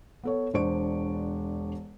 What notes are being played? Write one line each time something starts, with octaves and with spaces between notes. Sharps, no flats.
B3 A4 C#5
E1 D4 C5 D5 C#6 D7